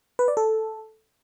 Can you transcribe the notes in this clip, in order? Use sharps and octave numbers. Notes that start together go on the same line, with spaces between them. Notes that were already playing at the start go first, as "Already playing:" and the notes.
B4
D5
A4